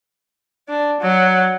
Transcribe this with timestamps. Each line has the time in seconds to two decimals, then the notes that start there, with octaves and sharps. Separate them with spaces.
0.68 D4
1.01 F#3